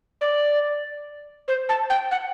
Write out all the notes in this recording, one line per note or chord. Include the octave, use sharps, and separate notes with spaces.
D5
C5
A5
G5
F#5